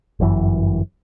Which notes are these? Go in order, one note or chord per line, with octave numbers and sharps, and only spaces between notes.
G1 F#2 E3